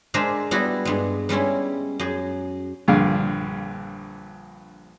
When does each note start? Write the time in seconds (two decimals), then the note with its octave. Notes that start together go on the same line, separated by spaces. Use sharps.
0.14 G#3 D4 G#4 A#4 C5 E5
0.51 G3 B3 E4 F#4
0.85 G2 G#3
1.29 G3 G#3 C#4 E4
1.99 F#2 G#4
2.88 A#1 G2 D3 F5